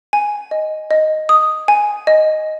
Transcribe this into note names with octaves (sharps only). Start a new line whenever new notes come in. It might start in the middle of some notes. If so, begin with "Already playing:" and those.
G#5
D#5
D#5
D#6
G#5
D#5